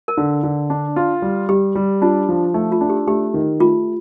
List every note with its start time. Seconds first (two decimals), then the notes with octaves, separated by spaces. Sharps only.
0.08 A#4
0.17 D3
0.43 D3
0.70 D4
0.96 F4
1.22 G3
1.49 G3 G4
1.75 G3
2.02 D4 F4
2.29 F3
2.54 A3 D#4
2.72 F4
2.81 D4
2.89 G4
3.07 A3 G4
3.34 D#3
3.60 A3 F4